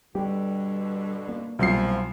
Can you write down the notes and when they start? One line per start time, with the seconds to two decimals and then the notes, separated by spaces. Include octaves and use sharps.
0.15 G2 B2 D3 G3 G4
1.29 A#3
1.59 C2 B2 F3 F#3 C7